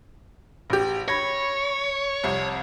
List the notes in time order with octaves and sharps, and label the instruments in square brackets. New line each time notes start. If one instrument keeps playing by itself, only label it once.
[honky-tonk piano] A1 G4
[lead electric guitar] C#5 [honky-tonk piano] B5 G#6 A#6
[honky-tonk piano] C2 F2